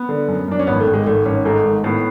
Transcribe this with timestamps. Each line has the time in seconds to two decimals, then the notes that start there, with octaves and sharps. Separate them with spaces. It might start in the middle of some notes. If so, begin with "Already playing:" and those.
Already playing: B3
0.09 D3
0.28 F#2
0.48 F#2 D4
0.59 C#4
0.67 G#1 B3
0.80 A3
0.87 G#1
0.94 G#3
1.06 G#1 A3
1.25 G#1 C#4
1.45 G#2 A3
1.65 G#1
1.84 A2 B3